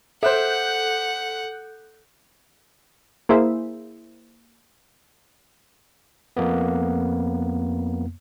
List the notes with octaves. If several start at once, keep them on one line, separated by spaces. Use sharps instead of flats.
A4 C5 E5 F#5 F#6 G6
A#3 E4 G#4 C5 E5
F2 A#3 B3